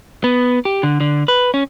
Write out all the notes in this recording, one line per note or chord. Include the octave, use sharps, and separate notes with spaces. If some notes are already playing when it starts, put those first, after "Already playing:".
B3
G4
D3
D3
B4
C#4